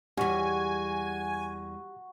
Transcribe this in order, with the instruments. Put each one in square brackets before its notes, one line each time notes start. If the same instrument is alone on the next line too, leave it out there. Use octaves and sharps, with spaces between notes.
[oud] E2 G3 [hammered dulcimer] F#4 [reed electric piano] G4 [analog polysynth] G#5